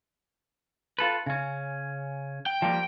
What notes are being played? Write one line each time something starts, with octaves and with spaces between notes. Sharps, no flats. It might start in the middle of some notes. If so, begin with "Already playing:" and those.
F4 A4 B4
C#3 C#4
G5
F3 G3 A#3